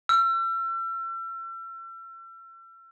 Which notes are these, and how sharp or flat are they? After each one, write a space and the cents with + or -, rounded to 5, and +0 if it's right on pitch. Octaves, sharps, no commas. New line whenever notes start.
E6 +40